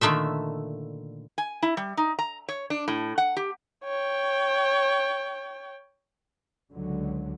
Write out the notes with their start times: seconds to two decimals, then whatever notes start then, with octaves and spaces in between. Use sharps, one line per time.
0.01 A#2 D3 D#3 A3 E5
1.38 G#5
1.63 E4
1.77 G3
1.97 D#4
2.19 A#5
2.49 C#5
2.70 D4
2.88 A2
3.18 F#5
3.37 G4
3.84 C#5 G5
6.70 C#2 D3 F#3